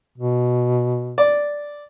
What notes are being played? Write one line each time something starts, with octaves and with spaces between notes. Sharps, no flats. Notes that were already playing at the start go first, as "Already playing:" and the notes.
B2
D5